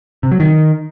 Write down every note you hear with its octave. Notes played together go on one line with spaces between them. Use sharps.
C3
F#3
D#3